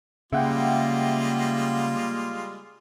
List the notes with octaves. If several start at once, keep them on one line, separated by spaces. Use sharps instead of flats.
C#3 G3 G#3 A#3 F4 E5 F#5 G5